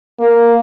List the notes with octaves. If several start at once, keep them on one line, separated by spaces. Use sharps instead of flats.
A#3